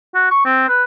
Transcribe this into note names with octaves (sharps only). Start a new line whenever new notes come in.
F#4
C#6
C4
B4